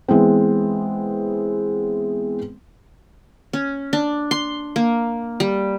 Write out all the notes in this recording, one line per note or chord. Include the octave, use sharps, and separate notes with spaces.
E3 G#3 B3 C4
C#4
D4
C6
A#3
G3